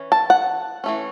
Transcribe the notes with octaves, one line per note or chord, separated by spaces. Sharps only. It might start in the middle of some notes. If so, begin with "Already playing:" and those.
Already playing: E3 C#4
A5
F#5
E3 A3 C#4